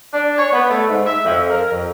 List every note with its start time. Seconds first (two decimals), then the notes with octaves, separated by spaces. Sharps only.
0.12 D4
0.36 C#5
0.51 B3
0.69 A3
0.88 G#2
1.04 E5
1.24 F2
1.49 A#4
1.70 F2